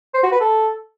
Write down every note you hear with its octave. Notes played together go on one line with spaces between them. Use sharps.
C5
F#4
B4
A4